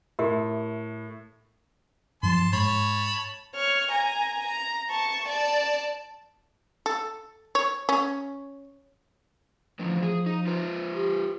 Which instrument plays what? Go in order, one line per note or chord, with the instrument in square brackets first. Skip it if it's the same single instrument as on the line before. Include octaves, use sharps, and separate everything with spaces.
[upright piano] A2 [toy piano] G4 A#4 E5
[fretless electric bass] G2 F3 [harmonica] A5 C6
[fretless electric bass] G#2 [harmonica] C#5 A5 B5
[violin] C#5 F6
G#5 A#5
A#5
A5 C#6
D5 A5
[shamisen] A4
C#5
C#4
[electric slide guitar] A2 D3 E3 [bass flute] F3
[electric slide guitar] G#4
D#4
F4 B4 C5
[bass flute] G4